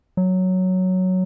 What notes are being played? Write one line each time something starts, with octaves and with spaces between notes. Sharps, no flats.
F#3